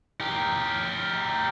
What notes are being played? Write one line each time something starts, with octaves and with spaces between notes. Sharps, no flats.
G4 A#4